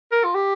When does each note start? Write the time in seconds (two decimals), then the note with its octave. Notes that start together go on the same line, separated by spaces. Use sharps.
0.12 A#4
0.24 F4
0.35 G4